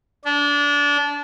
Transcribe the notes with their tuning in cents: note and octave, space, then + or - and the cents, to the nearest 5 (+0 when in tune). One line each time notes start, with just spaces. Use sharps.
D4 -25